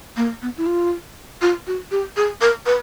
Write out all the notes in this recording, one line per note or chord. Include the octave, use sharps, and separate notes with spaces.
A#3
B3
E4
F4
F4
F#4
G4
G#4
A#4
B4